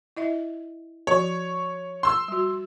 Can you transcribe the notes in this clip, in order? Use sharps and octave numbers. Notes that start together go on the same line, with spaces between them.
E4 D#5 E5
F3 F#4 C#5
C6 E6
G3 F#4